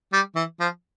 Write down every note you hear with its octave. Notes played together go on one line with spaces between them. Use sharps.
G3
E3
F3